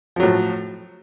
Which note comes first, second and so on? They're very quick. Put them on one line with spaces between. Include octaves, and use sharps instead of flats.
F3 F#3 A2